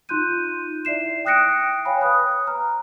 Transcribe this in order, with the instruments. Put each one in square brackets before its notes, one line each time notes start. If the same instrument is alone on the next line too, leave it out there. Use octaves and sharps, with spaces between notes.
[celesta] D#4 F4 C6 F#6 G6 D#7
E4 D5 E5 C7 E7
G5 D#6 F#6 A#6 C#7 D7
C#5 F5 G5 G#5 B5
B4 D#6 F#6
A#5 F6